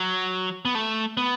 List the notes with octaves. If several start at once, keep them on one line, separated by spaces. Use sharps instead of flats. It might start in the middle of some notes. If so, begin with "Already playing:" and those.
Already playing: F#3
B3
A3
B3